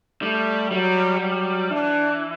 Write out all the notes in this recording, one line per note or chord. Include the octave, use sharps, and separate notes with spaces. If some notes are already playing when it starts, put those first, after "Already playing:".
G3 A3
F#3 G3
F#3
E3 D4